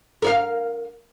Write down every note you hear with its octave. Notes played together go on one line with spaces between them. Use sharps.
A#4 D5 F5